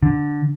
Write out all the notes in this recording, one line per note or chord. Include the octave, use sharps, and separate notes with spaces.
D3